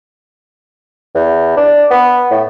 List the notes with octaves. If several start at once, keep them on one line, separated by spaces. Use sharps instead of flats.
E2
D4
B3
A2